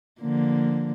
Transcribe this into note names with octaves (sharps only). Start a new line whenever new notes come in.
D3 F3 A#3